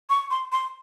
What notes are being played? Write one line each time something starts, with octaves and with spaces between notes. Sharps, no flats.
C#6
C6
C6